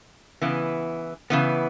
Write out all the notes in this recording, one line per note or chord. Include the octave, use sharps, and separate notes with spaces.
C#3 E3 B3
C#3 E3 B3